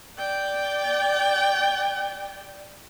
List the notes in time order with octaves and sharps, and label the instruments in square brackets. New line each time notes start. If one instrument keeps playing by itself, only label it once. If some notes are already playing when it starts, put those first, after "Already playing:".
[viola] D5 G5